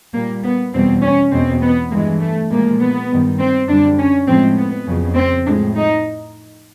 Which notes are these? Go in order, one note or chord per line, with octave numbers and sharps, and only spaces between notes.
A#2 G3 A#3
B3
E2 B2 G3 C4
C#4
E2 B2 G#3 C4
B3
G2 E3 G#3 A#3
A3
A#2 F3 G#3 A#3
B3
G2 D#3 G3
C4
F#2 D3 G3 D4
C#4
A2 F3 G#3 C4
B3
F2 C#3 F#3
C4
A2 F3 G#3 D4
D#4